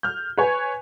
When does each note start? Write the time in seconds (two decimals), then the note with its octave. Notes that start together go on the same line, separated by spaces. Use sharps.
0.03 F6 G6
0.38 B4 C#5 G#5